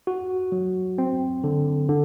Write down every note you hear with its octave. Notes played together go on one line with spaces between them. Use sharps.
F#4
F#3
C4
D3
D3